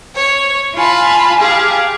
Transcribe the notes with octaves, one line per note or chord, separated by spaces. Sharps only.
C#5
F4 G#5 A5 B5
G4 G#4 F5 A5